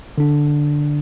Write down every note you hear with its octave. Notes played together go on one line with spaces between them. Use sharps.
D3 D4